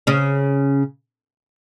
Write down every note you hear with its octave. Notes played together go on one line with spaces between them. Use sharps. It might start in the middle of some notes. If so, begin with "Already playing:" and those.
C#3 C#4